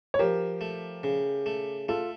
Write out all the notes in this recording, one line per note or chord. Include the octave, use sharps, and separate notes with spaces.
C#5
F3 G4 A#4
A3
C#3
A3
A3 F4 A4